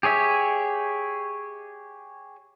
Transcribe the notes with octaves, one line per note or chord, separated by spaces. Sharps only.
G4 G#4 C#5 E5